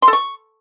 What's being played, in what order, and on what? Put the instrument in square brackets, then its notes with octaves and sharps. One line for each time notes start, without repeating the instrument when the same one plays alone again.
[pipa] C6
A4
C#6